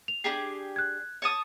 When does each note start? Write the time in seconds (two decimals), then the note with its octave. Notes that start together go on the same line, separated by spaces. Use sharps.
0.08 F7
0.24 D4 G4 G#4 C7
0.76 F#6 G#6
1.22 C#5 A5 D#6